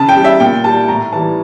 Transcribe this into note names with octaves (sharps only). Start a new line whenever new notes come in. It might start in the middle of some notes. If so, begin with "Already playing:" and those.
Already playing: C#3 A5
G5
G3
E5
A#2 G5
G3 A5
A2 A#5
E3 G3 A5